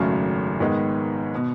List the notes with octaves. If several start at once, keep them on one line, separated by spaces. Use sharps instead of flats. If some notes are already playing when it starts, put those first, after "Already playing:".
Already playing: G#1 F#2 C#3 F#3 A3
G#2 D#3 G#3 B3
B2